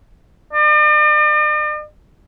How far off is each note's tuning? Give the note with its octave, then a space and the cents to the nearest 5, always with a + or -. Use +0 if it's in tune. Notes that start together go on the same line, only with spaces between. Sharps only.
D5 +45